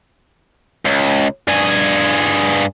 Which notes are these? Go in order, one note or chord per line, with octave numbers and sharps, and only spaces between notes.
C#2
G2 G#4